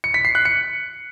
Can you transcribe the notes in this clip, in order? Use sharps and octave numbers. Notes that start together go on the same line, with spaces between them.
C#7
B6
C7
F#6
C#7